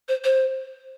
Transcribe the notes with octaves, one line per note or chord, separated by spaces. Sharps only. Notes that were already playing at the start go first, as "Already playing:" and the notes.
C5
C5